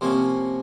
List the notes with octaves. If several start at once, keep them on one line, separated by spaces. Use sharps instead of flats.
C3 F3 A#3 C#4